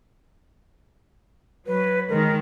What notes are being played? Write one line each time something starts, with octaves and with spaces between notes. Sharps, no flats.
F#3 B4
D#3 G#3 A#4